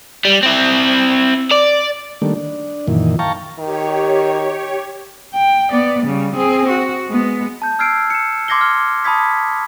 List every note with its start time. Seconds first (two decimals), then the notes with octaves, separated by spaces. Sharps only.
0.25 G3
0.43 C4 E4
1.51 D5
2.22 D#3 G3 A3 A#3 D4
2.35 D4
2.87 F#2 A#2 D#3 E3
3.19 F5 G5 A5 A#5 C#6
3.59 D#3 G4 C#5
5.34 G5
5.72 B3 D5
6.03 C#3 G3
6.36 C4 G#4
6.69 F#4
7.08 G#3 B3
7.62 A5 G6
7.79 E6 F6 G#6 C7 D7
8.10 C#7 E7
8.48 C6 D6 G#6 A#6 C7 G7
8.61 F6
9.04 A5 B5 D#6 G#6 B6